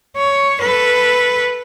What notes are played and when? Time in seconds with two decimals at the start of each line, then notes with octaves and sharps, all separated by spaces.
0.17 C#5
0.61 A4 B4